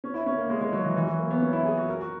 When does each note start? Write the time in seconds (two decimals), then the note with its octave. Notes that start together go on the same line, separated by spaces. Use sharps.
0.04 C#4
0.14 E4
0.26 C#4
0.38 A#3
0.50 G#3
0.61 G#3
0.73 F#3
0.85 E3
0.96 E3
1.07 F#3
1.19 A#3
1.31 B3
1.42 C#4
1.53 E4
1.65 G#4
1.77 F#4
1.88 A#4
2.00 F#4